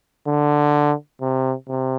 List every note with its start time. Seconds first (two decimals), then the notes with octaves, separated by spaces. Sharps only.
0.27 D3
1.21 C3
1.69 C3